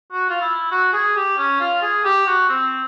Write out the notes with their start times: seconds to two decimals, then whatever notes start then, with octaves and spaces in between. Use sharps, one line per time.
0.12 F#4
0.30 F4
0.41 E4
0.71 F#4
0.93 G#4
1.16 G4
1.37 C#4
1.60 F4
1.82 G#4
2.05 G4
2.27 F#4
2.50 C4